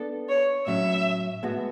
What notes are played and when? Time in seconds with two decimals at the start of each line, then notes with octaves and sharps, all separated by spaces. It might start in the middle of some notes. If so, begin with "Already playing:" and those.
Already playing: B3 D4 A4
0.29 C#5
0.67 A2 F#3 C#4 E5
1.43 A2 G#3 B3 F#4